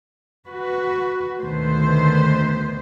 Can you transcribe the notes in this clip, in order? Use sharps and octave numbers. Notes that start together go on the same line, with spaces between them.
F#4 B4
D2 B2 D#3 A3 B4 C5